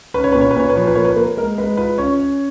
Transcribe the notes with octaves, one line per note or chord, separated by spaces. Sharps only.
C#4 B4
C#5
A#2 B4
C#5
B4
A#2 C#5
B4
F3 C#5
B4
A#3 C#5
B4
A#3
G#3 A#4
G#3 B4
F4 B4
C#4 C#5
C#4